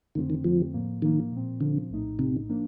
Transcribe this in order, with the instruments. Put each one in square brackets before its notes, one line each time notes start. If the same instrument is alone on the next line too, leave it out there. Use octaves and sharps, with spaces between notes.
[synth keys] F2 D3 A3 C4 [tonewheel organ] D#3
[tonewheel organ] D#3
[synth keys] F2 D3 A3 C4 [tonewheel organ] F3
[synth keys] A2 F3 A#3
[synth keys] A2 F3 A#3 [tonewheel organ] D#3
[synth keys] A#2 F3 C4
[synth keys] A#2 F3 C4 [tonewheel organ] D3
[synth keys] A#1 A2 A3 D#4
[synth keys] A#1 A2 A3 D#4 [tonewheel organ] C3
[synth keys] F3 A#3 D4